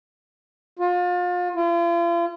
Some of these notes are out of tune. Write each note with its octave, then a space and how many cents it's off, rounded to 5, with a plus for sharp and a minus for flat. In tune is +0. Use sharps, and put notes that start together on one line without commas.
F4 +35
F4 -40